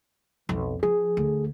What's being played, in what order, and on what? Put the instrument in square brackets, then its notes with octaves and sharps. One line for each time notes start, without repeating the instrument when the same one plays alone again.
[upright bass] B1 [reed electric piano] F2
[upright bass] F3 [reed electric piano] G#4
[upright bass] D2